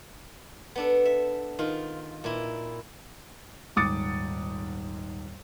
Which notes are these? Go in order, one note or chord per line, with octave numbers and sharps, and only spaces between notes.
B3 D4 A4
E5
D#3 F4
A#2 E4
D#1 G#2 D6 D#6 A6 C#7